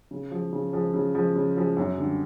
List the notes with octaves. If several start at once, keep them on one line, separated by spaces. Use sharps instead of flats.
C#3
F3 G#3
C#3
F3 G#3
C#3
F3 G#3
C#3
F3 G#3
F#2
D3 G3